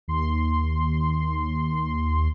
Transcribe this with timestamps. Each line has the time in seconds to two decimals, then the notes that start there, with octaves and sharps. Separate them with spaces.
0.08 D#2 C6